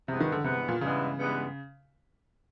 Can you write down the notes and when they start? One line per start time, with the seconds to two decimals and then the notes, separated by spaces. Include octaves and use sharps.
0.08 G2 C3 E3 G#3 B3
0.20 D#3
0.32 D3
0.44 G2 C3 E3 G#3 B3
0.68 A#2
0.81 G2 C#3 E3 G#3 B3
1.17 G2 E3 G#3 B3